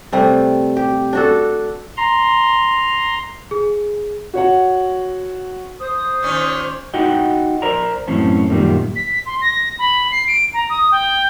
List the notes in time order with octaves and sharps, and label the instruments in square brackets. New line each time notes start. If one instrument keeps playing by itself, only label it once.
[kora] C3 G3 A3
G4
D4 F#4 A4
[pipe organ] A#5 C6
[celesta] G#4
[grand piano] F#4 C#5 F#5
[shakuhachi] C5 [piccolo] D#6
[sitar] A#2 D#3 C#4
[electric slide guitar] D#4 F#4 D#5 F#5 G5
A#4 C5 D5 A#5
F#2 A2 E3 C4 C#4 A5
F#2 A#2 D#3 G3
[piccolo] B6
C6
A#6
B5
C7
D7
A#5
D#6
G5